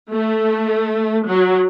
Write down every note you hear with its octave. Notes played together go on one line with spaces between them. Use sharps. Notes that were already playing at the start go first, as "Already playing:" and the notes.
A3
F#3